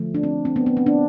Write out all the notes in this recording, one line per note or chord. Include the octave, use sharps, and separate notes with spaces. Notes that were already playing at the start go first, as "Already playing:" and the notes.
Already playing: D3 F3 A3
D4
C4
C4
B3
B3
C4
D4